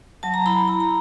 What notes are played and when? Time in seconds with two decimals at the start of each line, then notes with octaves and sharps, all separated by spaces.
0.23 F#3 A5
0.34 A#5
0.46 E4 B5
0.68 E4 A#5
0.80 A#5